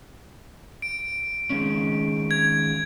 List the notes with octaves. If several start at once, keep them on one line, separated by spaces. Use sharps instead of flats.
D7
D#3 G#3 C#4
G#6